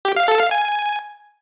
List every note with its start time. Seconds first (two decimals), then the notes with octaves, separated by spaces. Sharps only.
0.05 G4
0.17 F5
0.28 A4
0.40 F5
0.51 G#5